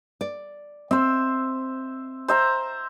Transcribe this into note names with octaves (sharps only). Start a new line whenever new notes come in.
D5
C4 C5 E5
C5 E5 A#5